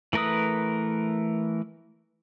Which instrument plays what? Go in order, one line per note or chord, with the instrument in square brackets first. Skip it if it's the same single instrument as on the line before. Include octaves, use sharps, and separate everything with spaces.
[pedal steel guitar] E3 A3 A#4 B4 D#6